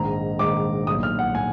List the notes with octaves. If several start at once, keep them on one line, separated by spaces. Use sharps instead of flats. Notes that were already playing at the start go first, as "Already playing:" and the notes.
Already playing: A#1 G#2 D#3 A#5
A#1 G#2 D#3 D6
B1 A#2 D#6
F6
F#5
A#2 G#5